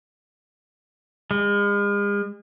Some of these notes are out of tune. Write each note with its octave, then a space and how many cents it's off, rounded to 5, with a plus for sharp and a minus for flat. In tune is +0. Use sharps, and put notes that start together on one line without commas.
G#3 -40